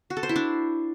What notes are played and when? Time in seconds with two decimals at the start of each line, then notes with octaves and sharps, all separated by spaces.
0.10 F#4
0.17 A4
0.23 C5
0.29 E4
0.36 D4